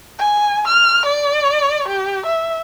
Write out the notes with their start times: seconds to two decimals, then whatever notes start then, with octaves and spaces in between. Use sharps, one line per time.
0.18 G#5
0.67 F6
1.06 D5
1.88 G4
2.26 E5